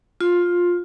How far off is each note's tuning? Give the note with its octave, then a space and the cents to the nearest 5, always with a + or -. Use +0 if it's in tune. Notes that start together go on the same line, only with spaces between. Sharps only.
F4 +10